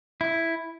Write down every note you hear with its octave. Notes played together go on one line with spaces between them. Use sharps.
E4